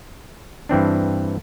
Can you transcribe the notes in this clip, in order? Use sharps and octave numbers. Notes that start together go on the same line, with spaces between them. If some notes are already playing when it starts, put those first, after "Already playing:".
G2 E3 C4 D4